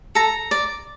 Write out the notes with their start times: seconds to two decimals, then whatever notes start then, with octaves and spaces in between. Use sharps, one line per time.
0.15 A4 A#5
0.51 D5